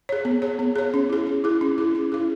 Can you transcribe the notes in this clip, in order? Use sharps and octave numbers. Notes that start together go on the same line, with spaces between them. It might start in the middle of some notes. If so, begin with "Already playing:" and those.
G#4 C#5
B3
G#4 C#5
B3
G#4 C#5
C#4
E4 G#4
C#4
E4 G#4
C#4
E4 G#4
C#4
E4 G#4